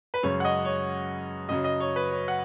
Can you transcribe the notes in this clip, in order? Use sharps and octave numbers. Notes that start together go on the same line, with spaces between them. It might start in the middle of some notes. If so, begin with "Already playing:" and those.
B4
F#2 C#3 G#3 C#5
F#5
D#5
C#5
F#2 C#3 F#3 D#5
D#5
C#5
B4
C#5
F#5